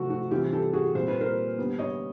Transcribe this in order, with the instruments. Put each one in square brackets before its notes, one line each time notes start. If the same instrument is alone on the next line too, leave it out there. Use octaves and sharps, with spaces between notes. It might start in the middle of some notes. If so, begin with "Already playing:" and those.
Already playing: [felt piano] C3 F3 A3 C4 F#4
F#4
C3 E3 G3 C4 F4 G4
G4 A4
F#4 G#4
A#2 G3 C4 C5
B4
A#4 C5
D3 G3 B3
C#5 D#5